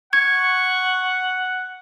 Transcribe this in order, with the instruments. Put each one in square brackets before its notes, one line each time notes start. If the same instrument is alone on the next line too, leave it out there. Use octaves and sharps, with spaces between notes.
[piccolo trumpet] F#5 [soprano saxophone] C#6 [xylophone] G#6